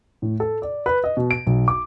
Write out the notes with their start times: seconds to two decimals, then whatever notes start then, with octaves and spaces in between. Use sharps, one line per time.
0.22 A2
0.40 A4
0.62 D5
0.86 B4
1.04 D#5
1.17 B2
1.31 D7
1.47 B1
1.68 D6